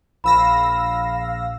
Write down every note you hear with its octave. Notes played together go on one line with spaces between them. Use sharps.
A#1 F5 B5 E6 A#6